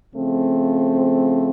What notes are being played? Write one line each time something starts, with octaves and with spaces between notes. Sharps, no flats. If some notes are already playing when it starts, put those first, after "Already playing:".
C#3 F3 A3 C4